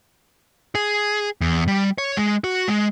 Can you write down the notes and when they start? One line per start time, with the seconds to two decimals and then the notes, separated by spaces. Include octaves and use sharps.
0.75 G#4
1.41 E2
1.68 G3
1.98 C#5
2.17 G#3
2.44 F#4
2.68 G#3